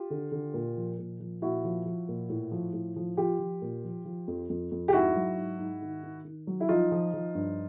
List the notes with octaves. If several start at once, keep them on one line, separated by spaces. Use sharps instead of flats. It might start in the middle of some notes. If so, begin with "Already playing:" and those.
Already playing: F4 G4
D3
D3
A#2
F3
A#2
F3
A#2 E4 F#4
F3
F3
A#2
A2
F3
A2
F3
F3 F4 G4
F3
A#2
F3
F3
F2
F2
F2
G4
G#2 E4 F#4
F#3
G#2
G#2
D#3
D#3
D#3
F#3
E4
F3 D#4 F4
F3
F3
G2